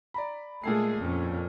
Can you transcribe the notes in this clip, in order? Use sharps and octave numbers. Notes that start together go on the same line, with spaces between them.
D5 A#5 B5
A#2 G#3 A3 G#4 A4 C7
F2 C#4